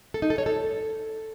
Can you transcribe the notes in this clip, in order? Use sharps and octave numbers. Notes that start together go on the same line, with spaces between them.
A4
D#4
A4
C#5
A4